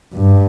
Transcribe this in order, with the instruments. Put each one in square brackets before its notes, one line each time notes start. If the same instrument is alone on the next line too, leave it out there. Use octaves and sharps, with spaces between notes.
[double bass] G2